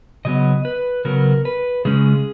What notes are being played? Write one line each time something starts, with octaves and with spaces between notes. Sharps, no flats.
C#3 F#3 B3 D#5
B4
C#3 F#3 B3 A#4
B4
C#3 G#3 C#4 G#4